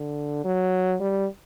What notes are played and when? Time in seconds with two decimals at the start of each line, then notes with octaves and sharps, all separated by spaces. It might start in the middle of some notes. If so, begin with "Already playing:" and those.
Already playing: D3
0.45 F#3
1.01 G3